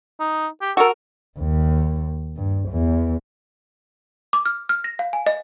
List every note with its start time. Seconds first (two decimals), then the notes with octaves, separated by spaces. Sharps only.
0.20 D#4
0.62 G4
0.77 F#4 A4 A#4
1.39 D#2
2.36 G2
2.69 E2
4.33 D6
4.46 F6
4.69 F6
4.84 A#6
4.99 F5
5.13 G#5
5.27 D#5